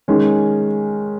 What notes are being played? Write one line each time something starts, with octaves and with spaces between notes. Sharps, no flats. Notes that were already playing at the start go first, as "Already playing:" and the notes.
D#3 G#3 C#4